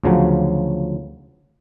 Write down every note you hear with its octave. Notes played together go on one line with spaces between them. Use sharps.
D2 C#3 F3 F#3